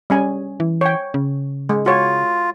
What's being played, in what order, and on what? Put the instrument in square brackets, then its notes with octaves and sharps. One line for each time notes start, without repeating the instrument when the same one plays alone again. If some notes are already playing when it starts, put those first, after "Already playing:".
[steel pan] G3 C#4 G#5
[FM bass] E3
[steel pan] C#5 G5
[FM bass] C#3
[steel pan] G#3
[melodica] F4 [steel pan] F#4 C#5